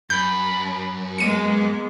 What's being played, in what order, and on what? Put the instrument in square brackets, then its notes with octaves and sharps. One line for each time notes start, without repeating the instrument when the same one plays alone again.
[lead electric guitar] F#2 [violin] B5 [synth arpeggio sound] G6
[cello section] G#3 B3 [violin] A#3 [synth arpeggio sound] C#7 D#7